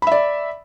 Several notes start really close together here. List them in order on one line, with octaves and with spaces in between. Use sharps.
B5 E5 D5